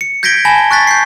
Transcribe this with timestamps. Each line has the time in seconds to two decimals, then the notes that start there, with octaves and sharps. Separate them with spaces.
0.01 C#7
0.23 G6 G#6 A#6 B6 D7 G7
0.45 G#5 A5 B5 A#6 G7
0.71 C#6 F#6 A6 B6
0.87 G6 C7